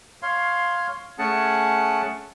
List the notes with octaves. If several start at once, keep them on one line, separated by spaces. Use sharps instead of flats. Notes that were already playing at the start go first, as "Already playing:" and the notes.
C#5 F5 C6
A3 C#4 G#4 F#5 A5